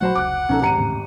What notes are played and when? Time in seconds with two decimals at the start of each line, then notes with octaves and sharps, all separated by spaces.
0.01 A#1 F#3 A3 F#4 C5 F#5 B5
0.15 F1 C#2 D6 F#6
0.49 C2 B2 F3 C#4 D#4 A4
0.62 G#1 G4 A#5 C#7 D#7
0.77 E2 A2 C#3